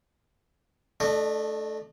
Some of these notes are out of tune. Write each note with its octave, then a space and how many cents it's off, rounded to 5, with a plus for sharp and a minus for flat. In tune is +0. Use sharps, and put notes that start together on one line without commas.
A3 -10 D4 +10 D#5 -25